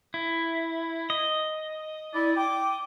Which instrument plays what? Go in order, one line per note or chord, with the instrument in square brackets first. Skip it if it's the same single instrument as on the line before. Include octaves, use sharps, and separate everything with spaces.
[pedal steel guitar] E4
D#5
[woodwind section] E4 D5
G5 D6